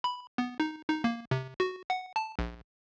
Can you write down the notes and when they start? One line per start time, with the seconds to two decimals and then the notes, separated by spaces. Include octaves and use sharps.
0.04 B5
0.38 B3
0.60 D#4
0.89 D#4
1.04 A#3
1.31 C3
1.60 F#4
1.90 F#5
2.16 A5
2.39 A#1